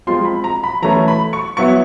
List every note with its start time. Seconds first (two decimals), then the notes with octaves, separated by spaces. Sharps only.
0.07 F3 G#3 C4 F4 C6
0.25 B5
0.44 A#5
0.64 B5
0.82 E3 A3 C#4 A#5
1.08 B5
1.33 C#6
1.57 F#3 B3 E4 C#6